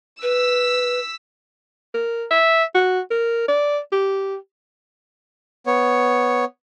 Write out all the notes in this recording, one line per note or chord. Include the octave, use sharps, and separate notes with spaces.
B4 E6 B6
A#4
E5
F#4
A#4
D5
G4
B3 C#5